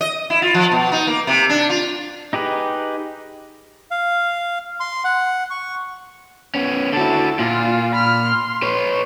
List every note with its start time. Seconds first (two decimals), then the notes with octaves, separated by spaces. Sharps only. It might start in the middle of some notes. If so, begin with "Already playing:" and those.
0.01 D#5
0.30 E4
0.42 F4
0.54 F3
0.72 B2
0.92 D#4
1.07 A#3
1.27 C3
1.49 D4
1.70 F4
2.33 D#4 G4 G#4 B4
3.91 F5
4.80 C6
5.04 F#5
5.50 C#6
6.55 B3 C#4
6.93 D3 E4 F#4 A5
7.39 A#2 F4
7.92 B5 F6
8.27 C6
8.63 B4 C#5